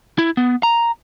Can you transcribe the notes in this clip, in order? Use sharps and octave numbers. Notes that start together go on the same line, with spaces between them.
E4
B3
A#5